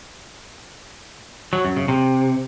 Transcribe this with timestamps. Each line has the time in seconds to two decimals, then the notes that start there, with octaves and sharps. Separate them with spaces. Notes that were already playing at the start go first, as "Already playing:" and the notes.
1.53 F#3
1.65 F#2
1.76 C#3
1.88 C3